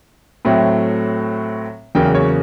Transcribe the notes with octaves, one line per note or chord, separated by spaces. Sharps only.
A2 F#3 A3 C4
E2 C#3 F#3 A#3 G5
C#5